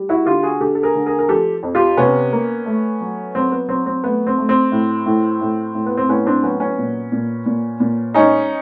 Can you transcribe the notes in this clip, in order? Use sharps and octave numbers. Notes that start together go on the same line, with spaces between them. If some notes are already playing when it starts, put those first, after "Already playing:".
Already playing: G3
E4 F#4
D3 F4 G4
F#4 G#4
D3 G4 A4
A4
G#4 A#4
D3
G#4 A#4
A#4
F3 G4 A4
F2
F4 G4
C3 B3 C#4
A#3
A3
F#3
F#3 C4
B3
F#3 C4
C4
A3 B3
C4
A3
C4
A2
A2
A2
A2
B3
C4
A2 B3 C#4
C4 D4
F#3 B3 C#4
B3 C#4
A#2
A#2
A#2
A#2
G#3 C#4 D#4